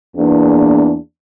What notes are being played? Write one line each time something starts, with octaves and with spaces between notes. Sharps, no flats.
E2 A#3 D4